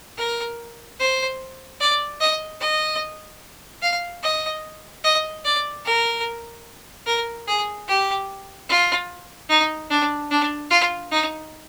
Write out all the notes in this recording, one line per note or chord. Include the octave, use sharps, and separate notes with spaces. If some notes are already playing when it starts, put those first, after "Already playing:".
A#4
C5
D5
D#5
D#5
F5
D#5
D#5
D5
A#4
A#4
G#4
G4
F4
D#4
D4
D4
F4
D#4